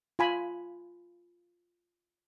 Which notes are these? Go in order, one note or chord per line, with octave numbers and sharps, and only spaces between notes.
F4 G#5 B5